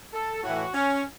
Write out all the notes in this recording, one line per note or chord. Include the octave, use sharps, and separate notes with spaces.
A4
A2 E3 F#4
C#4